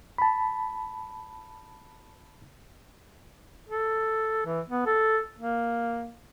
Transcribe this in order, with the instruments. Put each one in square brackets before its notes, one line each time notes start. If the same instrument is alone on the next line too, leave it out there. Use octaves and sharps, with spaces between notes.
[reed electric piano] A5 B5
[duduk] A4
E3
B3
A4
A#3